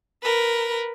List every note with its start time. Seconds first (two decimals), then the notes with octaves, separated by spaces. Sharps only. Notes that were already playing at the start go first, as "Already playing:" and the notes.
0.23 A#4 B4